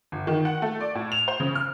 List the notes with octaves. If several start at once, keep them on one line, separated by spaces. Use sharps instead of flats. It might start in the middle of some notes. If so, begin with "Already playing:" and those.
G1
D#3
F#5
A3
D5
A2
F7
C5
C#3
F6